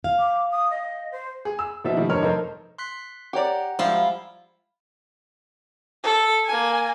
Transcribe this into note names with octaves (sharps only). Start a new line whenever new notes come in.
F5
D6
D#6
D#5
C5
G#4
E6
B2 F3 D#4 E5
D#3 F3 G3 A3
F1 G2 D#4 A#4 C#5 F6
F1 D#4 A4 A#4 C5
C6 F#6 B6
G4 C#5 D5 F#5 G5 A#5
F3 G3 G#3 E4 F4
A4
A#3 G#5